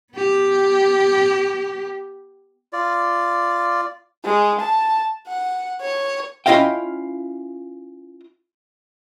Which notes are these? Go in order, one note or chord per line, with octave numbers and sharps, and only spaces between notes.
B3 G4
F4 D5
G#3
A5
F#5
C#5
C#4 E4 F4 D#5 F5 G5